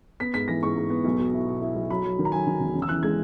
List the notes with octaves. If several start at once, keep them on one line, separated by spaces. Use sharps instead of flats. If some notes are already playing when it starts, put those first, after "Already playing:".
B3 B6
G#2 B6
E3 A#6
G#2 C#6
G#2
B3
B1
B2
E4
B2
E4
B1
F#3 B5
F#3
D#3
A#5
F#3 G#5
D#3
E1
C#3
E6
E3 F#6
G#3 G#6